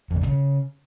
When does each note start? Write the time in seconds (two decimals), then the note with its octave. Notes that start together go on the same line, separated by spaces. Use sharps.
0.11 F2
0.16 C#3
0.21 G2
0.27 C#3